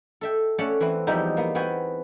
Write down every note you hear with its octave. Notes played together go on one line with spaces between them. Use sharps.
A4 E5 G5
A3 C#4 C#5 D5 F#5 A5
E3 C4 E4
E2 F3 G3 D#4 G4 E5
A#3 B3
B3 C4 F#4 G5 G#5